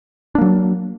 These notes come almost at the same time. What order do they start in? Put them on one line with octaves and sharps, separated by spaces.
D4 A#3 F#3